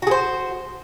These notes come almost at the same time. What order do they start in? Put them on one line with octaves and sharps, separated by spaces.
F#4 G#4 C5